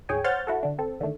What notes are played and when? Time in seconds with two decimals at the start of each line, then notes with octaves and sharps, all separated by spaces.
0.09 D2 G#2 G#4 C#5 G5 G#5
0.24 C5 C#5 F#5 F6 G6 A6
0.47 E4 F#4 A4
0.63 D3 D4
0.79 C4 A4
1.01 D3 D#3 A3 D4